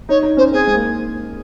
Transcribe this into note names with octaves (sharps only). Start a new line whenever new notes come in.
D#4 C#5
D#4
C#4 C5
C4 G#4
G#3
A#3